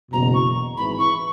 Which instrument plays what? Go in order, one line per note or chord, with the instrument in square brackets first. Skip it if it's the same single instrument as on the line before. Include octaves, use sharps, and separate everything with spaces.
[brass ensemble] F#1 E2 B2 [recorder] A#5
[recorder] C#6
[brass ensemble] G#1 G#2 E3 [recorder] B5
[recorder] C#6